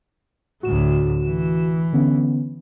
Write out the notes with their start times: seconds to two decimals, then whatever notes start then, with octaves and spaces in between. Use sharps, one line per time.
0.63 D2 A2 F#4 E7
1.24 E3
1.93 D3 B3 C#4